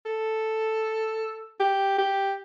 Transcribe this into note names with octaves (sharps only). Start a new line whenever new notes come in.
A4
G4
G4